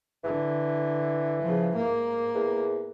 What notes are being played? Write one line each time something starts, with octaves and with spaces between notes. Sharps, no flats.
D3 E3
C#3 F3
G#2 A#3
E2